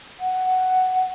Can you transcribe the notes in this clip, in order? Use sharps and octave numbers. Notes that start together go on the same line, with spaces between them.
F#5